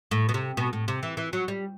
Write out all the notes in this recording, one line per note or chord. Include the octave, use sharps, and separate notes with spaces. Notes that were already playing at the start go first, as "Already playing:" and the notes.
A2
B2
C3
B2
A2
C3
E3
E3
F#3
G3